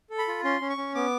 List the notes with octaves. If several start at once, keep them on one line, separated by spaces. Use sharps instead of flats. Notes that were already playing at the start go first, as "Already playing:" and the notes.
A4
B5
F4
C#4 C6
C#4
C#6
C#4
B3 D6